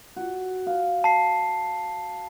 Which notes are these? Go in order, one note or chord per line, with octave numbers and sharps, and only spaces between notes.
F#4
F5
A5 C7